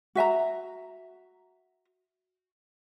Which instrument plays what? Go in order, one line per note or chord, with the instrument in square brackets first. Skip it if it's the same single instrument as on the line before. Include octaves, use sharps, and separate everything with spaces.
[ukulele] F#4 E5 G#5 A#5